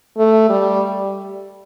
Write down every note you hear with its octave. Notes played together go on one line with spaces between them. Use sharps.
A3
G3